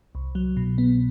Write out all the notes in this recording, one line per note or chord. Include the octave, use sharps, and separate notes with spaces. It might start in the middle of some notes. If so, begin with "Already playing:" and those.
C2
F#3
B2
B3